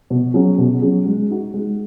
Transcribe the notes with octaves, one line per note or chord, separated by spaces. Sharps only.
B2
F#3 C#4 G#4
B2
F#3 C#4 G#4
G#3
D#4 F#4
G#3